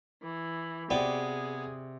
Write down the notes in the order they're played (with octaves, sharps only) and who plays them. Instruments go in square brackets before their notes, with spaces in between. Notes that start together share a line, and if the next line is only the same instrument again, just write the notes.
[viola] E3
[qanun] C3 F#4 D6 [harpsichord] B3 [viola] G#4 [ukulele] D5 G5